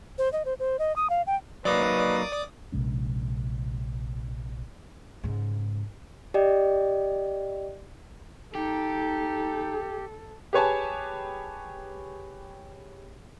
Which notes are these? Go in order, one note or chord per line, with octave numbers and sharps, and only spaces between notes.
C5
D#5
C5
C5
D#5
D#6
F5
G5
F#3 A#3 D#4 B4 D5 D6 D#6
A#1 C3 G#3 C#4
G#2 C#3
G4 D5 D#5 G5
D#4 G4 A4
G4 G#4 B4 C#5 G#5 A5